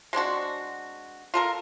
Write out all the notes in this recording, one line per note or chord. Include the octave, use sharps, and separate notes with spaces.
G#3 C4 D4 F#4
F4 A4 A#4